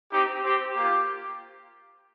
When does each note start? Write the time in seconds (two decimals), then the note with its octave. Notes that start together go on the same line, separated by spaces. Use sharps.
0.12 C4 D#4 G4
0.44 C4 G4
0.76 A#3 F4 G4